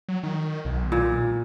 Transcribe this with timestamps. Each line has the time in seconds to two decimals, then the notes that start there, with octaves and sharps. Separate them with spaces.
0.09 F#3
0.23 D#3
0.65 B1
0.92 A#2